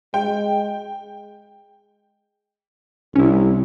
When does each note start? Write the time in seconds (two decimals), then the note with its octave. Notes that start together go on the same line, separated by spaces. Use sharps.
0.14 G#3 G5
3.15 C2 C#4 E4